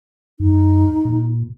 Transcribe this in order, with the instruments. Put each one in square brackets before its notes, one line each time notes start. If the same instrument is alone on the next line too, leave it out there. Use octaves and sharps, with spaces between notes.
[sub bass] F#2 [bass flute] D#4
[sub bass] A#2